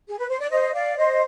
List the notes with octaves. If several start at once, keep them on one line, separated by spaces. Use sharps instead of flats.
G#4
B4
C5
D5
C5 D#5
D5 F5
C5 D#5